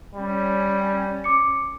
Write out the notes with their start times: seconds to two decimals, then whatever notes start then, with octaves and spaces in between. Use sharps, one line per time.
0.15 G3 C#4
1.24 D6 C#7